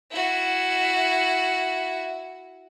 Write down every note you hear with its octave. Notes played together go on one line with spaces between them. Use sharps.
E4 F#4